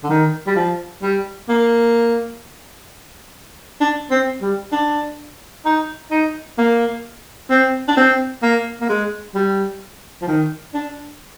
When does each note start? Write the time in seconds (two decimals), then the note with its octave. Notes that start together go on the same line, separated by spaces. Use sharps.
0.04 D3
0.10 D#3
0.47 G3
0.56 F3
1.02 G3
1.49 A#3
3.81 D4
4.11 C4
4.42 G3
4.72 D4
5.66 D#4
6.11 D#4
6.58 A#3
7.50 C4
7.88 D4
7.97 C4
8.43 A#3
8.81 A#3
8.89 G#3
9.35 G3
10.22 F3
10.28 D#3
10.74 D4